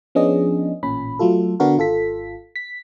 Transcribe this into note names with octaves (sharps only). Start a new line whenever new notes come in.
F3 B3 C#4 D4 G#4 D#5
A1 A#2 C#4 B5
F#3 A3 F4 A4
D3 B3 D4 F#4 A#4
G#1 F4 A4 B6
B6